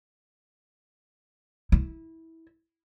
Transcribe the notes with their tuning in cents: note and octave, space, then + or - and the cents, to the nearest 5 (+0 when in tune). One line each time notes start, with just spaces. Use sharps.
E4 -20